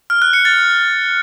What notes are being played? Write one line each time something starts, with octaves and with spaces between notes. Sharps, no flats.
F6
F#6
C#7
A6